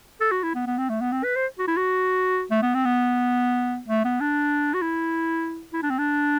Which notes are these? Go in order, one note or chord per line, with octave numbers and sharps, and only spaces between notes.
A4
F#4
E4
B3
B3
C4
A3
B3
C4
B4
C5
F#4
E4
F#4
A3
B3
C4
B3
A3
B3
D4
F#4
E4
E4
D4
C4
D4